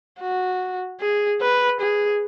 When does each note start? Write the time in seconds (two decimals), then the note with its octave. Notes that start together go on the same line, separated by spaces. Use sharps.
0.20 F#4
1.00 G#4
1.41 B4
1.81 G#4